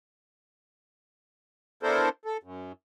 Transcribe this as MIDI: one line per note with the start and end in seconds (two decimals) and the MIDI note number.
1.83 2.09 59
1.83 2.09 62
1.83 2.09 64
1.83 2.09 69
1.83 2.09 70
1.83 2.09 72
2.25 2.37 69
2.43 2.72 42